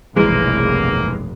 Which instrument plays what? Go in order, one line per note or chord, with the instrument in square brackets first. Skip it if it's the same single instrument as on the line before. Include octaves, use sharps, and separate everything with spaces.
[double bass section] F1 B1 G2 [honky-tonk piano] E3 G#3 [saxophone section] A#3